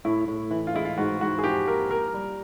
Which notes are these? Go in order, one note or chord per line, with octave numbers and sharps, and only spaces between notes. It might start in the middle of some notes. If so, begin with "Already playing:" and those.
A2 E4
A2
E3
F4
G#3 E4
F4
G#2 F#4
G#2 F#4
G#4
F3 G4
A#3 A#4
G4 A#4
G3